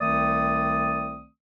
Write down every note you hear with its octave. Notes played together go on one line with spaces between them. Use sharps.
C2 D#3 A3 C4 D5 D#6